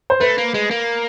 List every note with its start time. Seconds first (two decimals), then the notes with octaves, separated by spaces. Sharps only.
0.10 C5
0.20 A3 B4
0.38 A#3
0.54 G#3
0.71 A#3